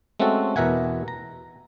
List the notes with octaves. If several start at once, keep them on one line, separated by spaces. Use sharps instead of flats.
G#3 A3 C4 C#4 F#4 A4
E2 B2 A#4 E5 F#5 G#5
A#5